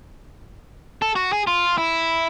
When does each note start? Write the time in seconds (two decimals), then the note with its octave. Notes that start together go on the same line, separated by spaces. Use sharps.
1.02 A4
1.16 F#4
1.33 G#4
1.47 F4
1.78 E4